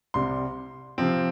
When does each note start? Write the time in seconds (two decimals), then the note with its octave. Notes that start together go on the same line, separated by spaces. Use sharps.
0.14 C2 C3 G3 C6
0.98 C3 F3 C4